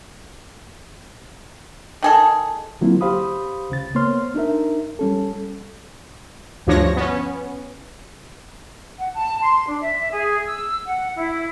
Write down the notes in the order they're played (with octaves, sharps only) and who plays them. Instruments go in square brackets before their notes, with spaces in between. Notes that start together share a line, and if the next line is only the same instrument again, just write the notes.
[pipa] D#3 G#4 A4
[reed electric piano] D3 F#3 A#3 C4 E4 F4
G4 C5 F5 B5 D#6
C#2 C#3 A6
A#3 B3 C5 C#5 C6 F6
D4 D#4 A#4 E5
G3 C#4 A4
[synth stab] D2 G2 F3 D4 C#5 A#6
B3 C#4
[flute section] F#5
A5
C6
D4
E5
G#4
E6
F#5
E4